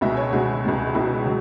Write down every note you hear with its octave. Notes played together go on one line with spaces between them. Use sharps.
C#2 B2 G#3 E5
C#5
C#2 B2 G#3 F#4
C#2 B2 G#3
C#2 B2 G#3 E4
C#3 F#3